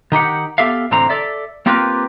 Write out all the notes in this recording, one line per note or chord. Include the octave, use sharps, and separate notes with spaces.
D#3 D#4 G4 F#5
B3 G4 A4 E5 F5
A2 D3 E3 C4 A#5
A4 D5 E5
A#3 C4 F4 G4 A#4 B4